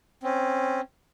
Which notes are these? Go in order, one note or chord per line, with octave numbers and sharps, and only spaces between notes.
C4 C#4